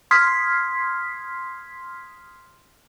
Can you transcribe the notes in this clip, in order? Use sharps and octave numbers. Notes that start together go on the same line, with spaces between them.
C6 D#6 F6 G#6 B6 C7